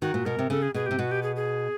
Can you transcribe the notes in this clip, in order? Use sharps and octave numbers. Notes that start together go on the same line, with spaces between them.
D#3 F#4
A#2
B2 A#4
C3
C#3 A4
G#4
B2 G#4
C3 G4
B2 F#4
G4
G#4
G#4